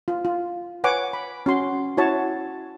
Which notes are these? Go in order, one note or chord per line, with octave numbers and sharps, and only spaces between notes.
F4
F4
B4 C#5 F#5 G#5 D6
B5
C#4 F#4 C6
E4 F#4 C#5 A5